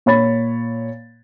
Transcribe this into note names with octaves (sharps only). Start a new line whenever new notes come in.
A#2 C#5 B5 A6